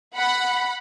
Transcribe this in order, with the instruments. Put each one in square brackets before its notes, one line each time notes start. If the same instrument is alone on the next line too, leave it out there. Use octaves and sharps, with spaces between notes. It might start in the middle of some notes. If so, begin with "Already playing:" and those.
[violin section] F#5 B5